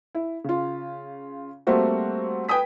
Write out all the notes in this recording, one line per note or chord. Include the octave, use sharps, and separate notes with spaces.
E4
C#3 F4
G3 A3 A#3 C4 F#4
B4 G5 G#5 D#6 B6